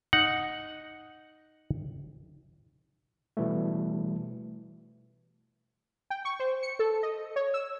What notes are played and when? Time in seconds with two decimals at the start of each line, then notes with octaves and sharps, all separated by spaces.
0.13 D#4 F#5
3.37 B2 E3 G3 A3
6.10 G5
6.25 C#6
6.40 C5
6.63 C#7
6.79 A4
7.03 D#5
7.36 C#5
7.54 E6